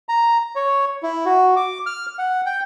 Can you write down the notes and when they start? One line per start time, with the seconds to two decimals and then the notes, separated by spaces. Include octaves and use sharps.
0.09 A#5
0.56 C#5
1.03 E4
1.26 F#4
1.56 D6
1.86 F6
2.19 F#5
2.46 G5